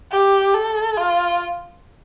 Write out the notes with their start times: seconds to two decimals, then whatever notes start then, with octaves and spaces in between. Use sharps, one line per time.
0.11 G4
0.54 A4
0.97 F4